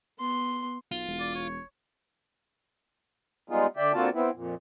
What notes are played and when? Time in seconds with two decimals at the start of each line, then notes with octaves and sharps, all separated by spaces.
0.19 B3 C6
0.91 B1 F4
1.08 E1
1.20 D5
1.36 C#5
3.50 G3 G#3 B3 D#4 F4 G#4
3.77 D3 D5 E5 G5
3.94 D3 A#3 C4 F4 F#4 A5
4.13 B3 C4 E4
4.34 F2 A#2